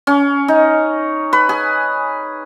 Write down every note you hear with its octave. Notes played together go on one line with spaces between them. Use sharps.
C#4
D#4
B4
G#4